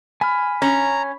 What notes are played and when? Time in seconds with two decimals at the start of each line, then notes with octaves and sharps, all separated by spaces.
0.21 G#5 B5 F6
0.62 C#4 A#5